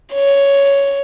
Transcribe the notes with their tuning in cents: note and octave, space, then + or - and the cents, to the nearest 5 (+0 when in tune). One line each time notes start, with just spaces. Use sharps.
C#5 +5